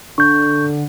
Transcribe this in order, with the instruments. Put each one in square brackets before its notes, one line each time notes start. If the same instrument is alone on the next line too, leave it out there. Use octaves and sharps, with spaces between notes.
[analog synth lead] D3 [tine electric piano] C#6 G6